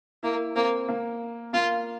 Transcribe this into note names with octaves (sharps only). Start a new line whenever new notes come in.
A#3 E4
A#3 C4
A#3
A#3 F4